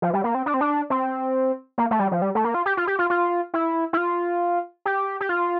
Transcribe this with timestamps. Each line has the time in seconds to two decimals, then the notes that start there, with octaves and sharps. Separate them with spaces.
0.02 F3
0.13 G3
0.24 A#3
0.35 C4
0.46 D4
0.54 C4
0.61 D4
0.90 C4
1.78 A#3
1.91 A3
2.00 G3
2.12 F3
2.22 G3
2.35 A3
2.44 A#3
2.54 F4
2.66 G4
2.77 F4
2.87 G4
2.99 F4
3.10 F4
3.54 E4
3.93 E4
3.97 F4
4.86 G4
5.20 G4
5.29 F4